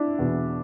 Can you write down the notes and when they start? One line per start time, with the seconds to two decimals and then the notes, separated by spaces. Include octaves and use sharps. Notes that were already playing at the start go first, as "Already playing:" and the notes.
Already playing: D4 E4
0.19 E2 B2